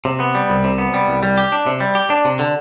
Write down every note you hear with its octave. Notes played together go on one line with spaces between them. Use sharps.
C3
B3
G3
C2
C3
B3
G3
C2
G3
G4
D4
C3
G3
G4
D4
C3
D3